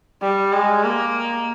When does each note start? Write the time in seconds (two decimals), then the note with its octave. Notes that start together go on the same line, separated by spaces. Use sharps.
0.22 G3
0.53 G#3
0.84 A#3